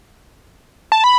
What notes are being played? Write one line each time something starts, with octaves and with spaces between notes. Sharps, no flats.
A5
B5